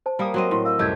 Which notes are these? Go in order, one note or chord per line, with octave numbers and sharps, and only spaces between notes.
C5 A5
G3 A#3 A#4 D#6
F#3 C4 D#5
A2 C6
D#5 F5 E6
C2 F#2 A3 G4 D#5 G6 G#6